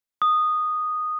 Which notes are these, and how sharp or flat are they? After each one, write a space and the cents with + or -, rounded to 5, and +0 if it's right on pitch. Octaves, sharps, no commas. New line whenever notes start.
D#6 -10